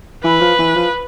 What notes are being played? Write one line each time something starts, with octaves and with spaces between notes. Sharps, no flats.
E3 B4
F3
E3
F3